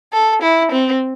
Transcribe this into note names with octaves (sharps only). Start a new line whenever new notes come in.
A4
E4
C4